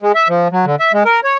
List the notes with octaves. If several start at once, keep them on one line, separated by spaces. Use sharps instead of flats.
G#3
E5
F3
F#3
D3
E5
G#3
A#4
C#5